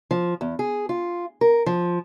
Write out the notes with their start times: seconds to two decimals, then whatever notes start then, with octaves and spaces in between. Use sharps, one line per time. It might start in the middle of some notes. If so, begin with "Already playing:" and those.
0.11 F3
0.41 E2
0.59 G#4
0.89 F4
1.41 A#4
1.66 F3